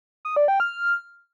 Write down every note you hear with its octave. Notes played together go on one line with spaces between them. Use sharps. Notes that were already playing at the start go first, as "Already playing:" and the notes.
D#6
D5
G5
F6